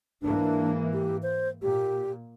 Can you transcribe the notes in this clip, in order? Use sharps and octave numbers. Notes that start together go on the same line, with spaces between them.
G#2 E3 A#3 D4
G4
C5
A#2 G4